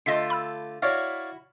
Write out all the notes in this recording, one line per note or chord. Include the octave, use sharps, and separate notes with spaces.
D3 A3 F4 D#5 B6
B5 E6
E4 F#4 C#5 D5 F5